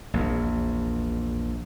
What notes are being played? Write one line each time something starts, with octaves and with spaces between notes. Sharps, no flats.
A#1 E2